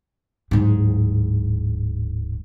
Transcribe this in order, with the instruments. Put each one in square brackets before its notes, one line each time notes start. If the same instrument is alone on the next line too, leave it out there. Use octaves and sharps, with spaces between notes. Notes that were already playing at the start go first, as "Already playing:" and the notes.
[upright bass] D1 G#2